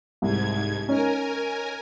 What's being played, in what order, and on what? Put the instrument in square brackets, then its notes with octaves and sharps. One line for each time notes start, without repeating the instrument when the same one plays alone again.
[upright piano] C2 [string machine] G#2 G#6
[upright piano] C#4 D#4 [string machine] A#4 G#5